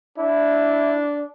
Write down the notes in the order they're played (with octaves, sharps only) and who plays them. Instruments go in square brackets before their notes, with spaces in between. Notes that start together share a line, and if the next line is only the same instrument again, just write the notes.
[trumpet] D4 [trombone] E4